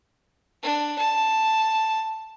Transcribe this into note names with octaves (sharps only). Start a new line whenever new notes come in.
D4
A5